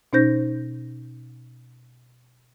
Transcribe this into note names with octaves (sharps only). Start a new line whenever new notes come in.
B2 C#4 D#4 C5 G6 A#6